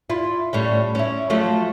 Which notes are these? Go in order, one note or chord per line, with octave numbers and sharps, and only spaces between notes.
E4 F4
A2 G3 C#4
C#4 E4
F3 F#3 A3